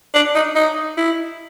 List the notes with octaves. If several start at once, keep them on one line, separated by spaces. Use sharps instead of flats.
D4
D#4
D#4
E4